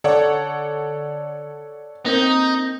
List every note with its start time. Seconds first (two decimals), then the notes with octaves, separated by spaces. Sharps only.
0.04 D3 A4 C#5 D5 F#5
2.06 A#3 C4 D#4 G6